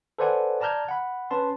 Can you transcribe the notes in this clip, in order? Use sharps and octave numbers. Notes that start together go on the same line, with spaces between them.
A4 B4 C5 D5 F#5 G#5
D5 A5 A#5 F6 G6 G#6
F#5 B5
C#4 B4 A5 C6